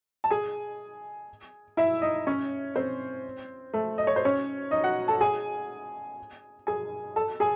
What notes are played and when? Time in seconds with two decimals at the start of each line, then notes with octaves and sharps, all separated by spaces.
0.24 A5
0.31 G#4 G#5
1.77 E4 E5
2.02 D#4 D#5
2.27 C#4 C#5
2.76 C4 C5
3.73 A3 A4
3.98 D#5
4.07 C#5
4.16 C5
4.25 C#4 C#5
4.71 D#4 D#5
4.84 F#4 F#5
5.08 A4 A5
5.21 G#4 G#5
6.67 G#4 G#5
7.16 A4 A5
7.40 G#4 G#5